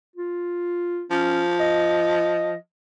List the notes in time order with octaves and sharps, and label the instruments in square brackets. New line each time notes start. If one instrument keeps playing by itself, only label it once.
[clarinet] F4
[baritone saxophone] F3 [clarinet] C#4
[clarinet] D#5